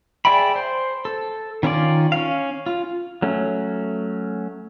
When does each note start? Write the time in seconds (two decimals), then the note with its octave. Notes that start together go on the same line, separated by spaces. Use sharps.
0.25 G#4 D5 E5 G5 B5
0.55 C5
1.05 A4
1.63 D#3 C#4 F4 D5
2.12 C#4 F5
2.66 F4
3.22 F#3 A3 C#4